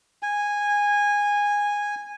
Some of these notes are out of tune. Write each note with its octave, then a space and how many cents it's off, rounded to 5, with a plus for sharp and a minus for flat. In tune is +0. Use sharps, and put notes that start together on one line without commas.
G#5 -15